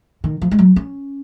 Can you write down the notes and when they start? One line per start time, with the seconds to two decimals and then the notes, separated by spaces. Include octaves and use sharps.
0.24 D#3
0.42 F3
0.51 G#3
0.59 F#3
0.76 C#4